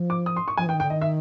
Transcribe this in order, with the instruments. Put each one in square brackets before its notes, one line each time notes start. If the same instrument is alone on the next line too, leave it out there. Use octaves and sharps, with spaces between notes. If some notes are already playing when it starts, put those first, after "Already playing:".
Already playing: [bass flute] F3
[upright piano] D6
D#6
C6
C#6
[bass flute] F3 [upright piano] G#5
[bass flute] E3 [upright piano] G5
[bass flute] D#3
[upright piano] G5
[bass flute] D3
[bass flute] D#3 [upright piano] D#5
[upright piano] E5